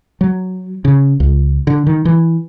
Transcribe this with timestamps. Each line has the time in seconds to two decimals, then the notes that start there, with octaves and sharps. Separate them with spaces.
0.21 F#3
0.85 C#3
1.20 C#2
1.67 D3
1.87 D#3
2.05 E3